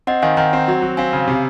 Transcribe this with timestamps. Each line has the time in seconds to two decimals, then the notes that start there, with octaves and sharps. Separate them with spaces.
0.07 C4 D#5 F#5
0.22 D#3 F5 G#5
0.37 D#3 F#5 A#5
0.53 C4
0.68 F#3
0.82 F#3
0.97 C4 F5 G#5
1.13 C#3
1.28 C3